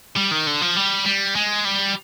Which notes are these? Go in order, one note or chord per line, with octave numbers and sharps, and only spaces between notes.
G3
D#3
D3
F3
G3
G3
G#3
G3